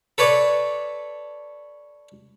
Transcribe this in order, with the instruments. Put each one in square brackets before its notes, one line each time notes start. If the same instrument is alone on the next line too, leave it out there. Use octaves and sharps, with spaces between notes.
[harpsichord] A4 B4 C#5 D5